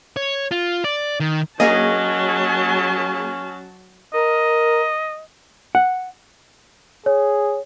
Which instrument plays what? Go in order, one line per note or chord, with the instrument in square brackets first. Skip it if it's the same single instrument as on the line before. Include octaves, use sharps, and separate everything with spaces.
[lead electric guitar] C#5
F4
D5
D#3
[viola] F#3 A5 [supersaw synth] A#3 G#4 [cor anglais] C#4 [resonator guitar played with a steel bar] C#5 D#5
[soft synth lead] A#4 [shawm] D#5
[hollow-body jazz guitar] F#5
[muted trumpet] G#4 [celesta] C#5